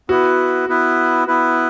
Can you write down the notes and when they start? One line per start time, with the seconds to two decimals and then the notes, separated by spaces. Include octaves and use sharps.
0.09 B3 E4 F#4 B4
0.68 B3 E4 B4
1.27 B3 E4 B4